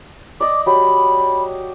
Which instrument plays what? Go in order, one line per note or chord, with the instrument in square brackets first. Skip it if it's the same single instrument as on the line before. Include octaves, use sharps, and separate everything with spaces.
[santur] D5 D#5 [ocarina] D6
[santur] F#3 G4 [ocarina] B5